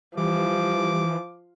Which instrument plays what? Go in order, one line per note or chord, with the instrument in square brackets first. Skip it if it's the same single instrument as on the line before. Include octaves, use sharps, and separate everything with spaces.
[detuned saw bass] E3 [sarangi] F3 [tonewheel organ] G3 [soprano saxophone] D6